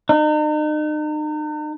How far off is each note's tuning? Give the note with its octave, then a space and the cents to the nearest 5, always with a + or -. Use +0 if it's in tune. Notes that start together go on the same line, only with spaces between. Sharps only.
D#4 -40